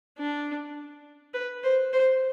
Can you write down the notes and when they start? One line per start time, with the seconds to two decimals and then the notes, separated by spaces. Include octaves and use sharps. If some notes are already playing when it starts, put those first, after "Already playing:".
0.18 D4
1.34 B4
1.63 C5
1.93 C5